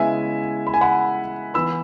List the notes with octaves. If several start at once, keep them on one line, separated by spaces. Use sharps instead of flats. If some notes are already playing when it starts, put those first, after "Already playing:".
Already playing: C#3 G#3 B3 E4 E5 G#5
B5
G#5
F#5 B5
E3 B3 E4 B5 E6